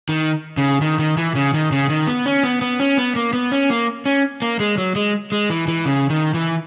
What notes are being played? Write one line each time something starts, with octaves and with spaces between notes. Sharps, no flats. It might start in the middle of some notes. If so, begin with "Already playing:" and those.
D#3
C#3
D#3
D#3
E3
C#3
D#3
C#3
D#3
B3
C#4
B3
B3
C#4
B3
A#3
B3
C#4
A#3
C#4
A#3
G#3
F#3
G#3
G#3
E3
E3
C#3
D#3
E3